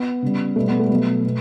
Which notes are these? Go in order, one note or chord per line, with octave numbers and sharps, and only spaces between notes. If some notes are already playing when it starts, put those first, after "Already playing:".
Already playing: B3
C#3 G3
B2 G3 A3
B3
A3
G3
B2 F#3 A3
B2